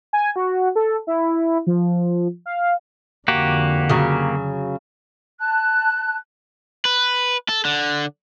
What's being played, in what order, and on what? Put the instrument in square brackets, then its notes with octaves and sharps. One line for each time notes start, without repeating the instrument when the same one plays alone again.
[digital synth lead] G#5
F#4
A4
E4
F3
F5
[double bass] F2 D3 [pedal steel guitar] A#3 F#4 G4
[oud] C#3 F#3
[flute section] A5 F#6
[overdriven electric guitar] B4
A4
D3